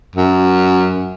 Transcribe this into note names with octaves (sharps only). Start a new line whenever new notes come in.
F#2